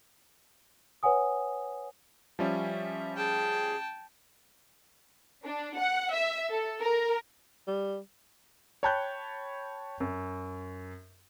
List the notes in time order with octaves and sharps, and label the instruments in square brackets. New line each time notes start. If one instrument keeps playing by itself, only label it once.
[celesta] B4 C#5 F#5 G#5 D#6
[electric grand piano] F3 G3 C#4 [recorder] E5
[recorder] G#4 [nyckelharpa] G5 A5
[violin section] D4
F#5
E5
A4
A#4
[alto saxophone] G3
[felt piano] C#5 G5 A5 B5 F#6 G6
F#2